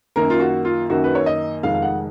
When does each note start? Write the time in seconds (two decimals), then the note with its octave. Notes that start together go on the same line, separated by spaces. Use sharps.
0.16 F#2 D#3 A#3 A#4
0.30 F4
0.40 F#4
0.65 F4
0.90 F#2 D#3 A#3 F#4
1.04 B4
1.15 C#5
1.26 D#5
1.63 F1 F2 D#3 G#3 F5
1.74 F5
1.82 F#5